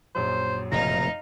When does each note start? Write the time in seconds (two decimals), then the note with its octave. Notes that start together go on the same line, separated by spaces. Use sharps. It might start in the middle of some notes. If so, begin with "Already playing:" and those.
0.15 A#1 F#2 F#3 C5
0.72 F1 A#2 C#3 D#4 F5 A#5